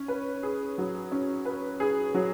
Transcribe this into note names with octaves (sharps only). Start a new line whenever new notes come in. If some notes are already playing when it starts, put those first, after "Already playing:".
Already playing: C#4
B4
G#4
F#3
C#4
B4
G#4
F#3